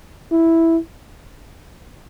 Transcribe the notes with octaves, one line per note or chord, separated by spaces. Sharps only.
E4